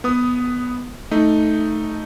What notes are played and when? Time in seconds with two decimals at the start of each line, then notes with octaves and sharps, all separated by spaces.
0.04 B3 D#6
1.11 A3 D#4